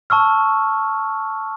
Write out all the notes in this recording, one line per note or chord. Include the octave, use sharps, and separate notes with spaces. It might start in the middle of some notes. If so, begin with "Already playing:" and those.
A5 C#6 E6 F6